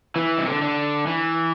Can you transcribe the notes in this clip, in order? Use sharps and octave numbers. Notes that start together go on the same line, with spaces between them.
E3
C3
D3
D3
E3